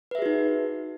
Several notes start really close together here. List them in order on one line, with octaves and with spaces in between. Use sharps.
B4 E5 G#4 F#4 D#4